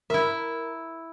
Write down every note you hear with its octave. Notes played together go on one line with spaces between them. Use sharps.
E4 A#4 E5